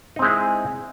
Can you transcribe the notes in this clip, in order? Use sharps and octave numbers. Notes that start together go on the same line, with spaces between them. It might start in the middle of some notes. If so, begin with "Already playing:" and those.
G#3 C4 D#4 E4 G#4